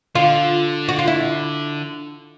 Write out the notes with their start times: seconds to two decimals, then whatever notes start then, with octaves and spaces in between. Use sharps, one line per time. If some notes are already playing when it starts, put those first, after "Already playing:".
0.15 D3 F4
0.89 F#4
0.99 F4
1.07 E4